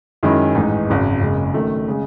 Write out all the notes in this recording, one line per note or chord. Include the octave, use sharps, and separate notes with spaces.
F#2 D#3 G#3 C#4 E4
A1 G#2 E3 G#3 D#4
G#1 F#2 C#3
F#1 F#2 C#3 G#3
F#2 D#3 A3
C#3 G#3